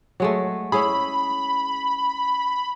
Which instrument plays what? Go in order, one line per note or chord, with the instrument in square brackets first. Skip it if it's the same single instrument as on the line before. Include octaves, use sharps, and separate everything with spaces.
[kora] F#3 G#3 A3
[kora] C#4 E4 G#4 [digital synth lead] B5